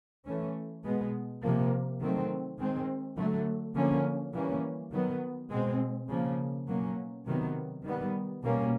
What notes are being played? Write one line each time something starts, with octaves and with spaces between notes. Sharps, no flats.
E3 A3 C#4
B2 G#3 B3
C3 F3 A#3
D#3 F#3 A3 C4
D#3 G#3 C4
D3 F#3 A3
D3 F3 A#3 C#4
E3 G3 A#3 C#4
D#3 F#3 B3
B2 G#3 C4
C#3 F3 A#3
B2 F#3 A#3 C#4
C3 D#3 F#3 B3
D#3 G3 B3
B2 G3 A#3 C#4